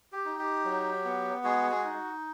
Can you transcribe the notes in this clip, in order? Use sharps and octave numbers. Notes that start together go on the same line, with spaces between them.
G4
D#4
G4
F#3
B3
G#3 F#4 G#4
G#3 G#4
D#4